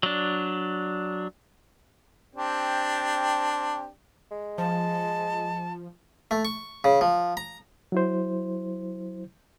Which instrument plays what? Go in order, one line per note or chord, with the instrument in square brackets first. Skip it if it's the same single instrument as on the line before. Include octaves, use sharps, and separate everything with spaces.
[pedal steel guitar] F#3 D4
[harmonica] C4 D4 G4
[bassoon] G#3
[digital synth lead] F3 [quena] A5
[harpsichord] A3
C#6
C#3
F3
A#5
[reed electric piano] F#3 E4 C5